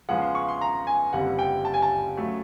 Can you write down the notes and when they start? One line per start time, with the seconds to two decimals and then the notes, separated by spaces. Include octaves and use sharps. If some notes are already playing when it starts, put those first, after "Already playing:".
0.09 E2 C#3 F3 G#3 F#5
0.22 C6
0.35 C#6
0.48 C6
0.61 A#5
0.87 G#5
1.13 F#1 F2 D3 G3 F#5
1.39 G5
1.65 A5
1.74 G#5
1.82 A5
2.17 C#3 F#3 A3